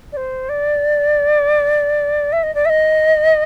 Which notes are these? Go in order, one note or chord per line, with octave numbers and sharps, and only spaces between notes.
D5
C5
D5
E5
D#5
D5
E5
D#5